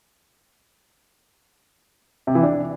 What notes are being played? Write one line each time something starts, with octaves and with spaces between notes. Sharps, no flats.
C3
E3
D4